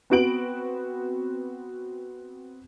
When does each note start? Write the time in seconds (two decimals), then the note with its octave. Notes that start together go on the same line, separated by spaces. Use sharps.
0.10 B3 C4 F#4 B4 D7 F#7